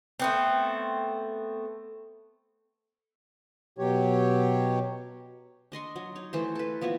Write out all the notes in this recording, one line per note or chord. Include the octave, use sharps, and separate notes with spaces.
A3 B3 C4
B2 F#3 G4 C#5
D4 D#5 C6 C#6
F#3
D#4 C#5
E3 A3 C5
A4 B4
F3 B3 E4 F#4